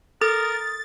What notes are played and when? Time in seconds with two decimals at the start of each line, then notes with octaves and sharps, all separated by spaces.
0.21 A4 A#4 D#6 A6